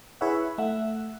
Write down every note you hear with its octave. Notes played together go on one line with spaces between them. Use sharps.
E4 G#4 B4 C#5 E5 F#5
A3 E5 F#5